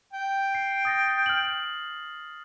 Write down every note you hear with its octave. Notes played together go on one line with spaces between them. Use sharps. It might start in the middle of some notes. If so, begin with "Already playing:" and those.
G5
C7
D#6 A6 A#6
F6 F#7